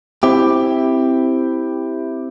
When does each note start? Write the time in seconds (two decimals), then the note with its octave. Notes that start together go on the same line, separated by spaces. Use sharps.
0.23 C4 E4 G4